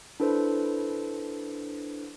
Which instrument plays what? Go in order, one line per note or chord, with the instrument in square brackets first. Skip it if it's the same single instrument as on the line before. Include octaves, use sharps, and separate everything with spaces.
[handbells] D4 E4 A4 B4 C5